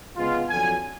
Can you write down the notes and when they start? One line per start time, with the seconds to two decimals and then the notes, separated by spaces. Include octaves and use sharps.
0.17 C#3 G#3 B3 F4
0.49 F2 D3 F#3 G#5